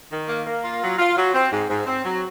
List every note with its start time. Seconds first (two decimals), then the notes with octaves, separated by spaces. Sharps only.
0.11 D#3
0.29 A#3
0.47 A#3
0.64 F4
0.81 F#3
0.99 F4
1.16 F#3
1.34 C4
1.52 G#2
1.69 G#2
1.87 C4
2.05 F#3